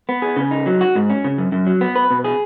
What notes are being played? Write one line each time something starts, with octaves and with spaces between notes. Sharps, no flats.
B3
G#4
C#3
D#4
F#3
F#4
G#2
C#4
C#3
F#2
F#2
F#3
B3
B4
B2
G#4